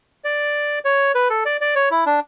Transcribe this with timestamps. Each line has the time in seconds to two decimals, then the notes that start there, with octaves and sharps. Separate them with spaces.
0.24 D5
0.85 C#5
1.15 B4
1.30 A4
1.46 D5
1.61 D5
1.75 C#5
1.91 E4
2.06 D4